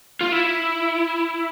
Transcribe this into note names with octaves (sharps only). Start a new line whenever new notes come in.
F4
E4